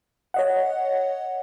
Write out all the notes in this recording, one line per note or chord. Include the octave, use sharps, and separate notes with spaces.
C#5 D#5 F#5